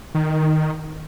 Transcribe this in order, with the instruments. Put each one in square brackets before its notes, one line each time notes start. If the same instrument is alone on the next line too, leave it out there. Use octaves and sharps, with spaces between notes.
[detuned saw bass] D#3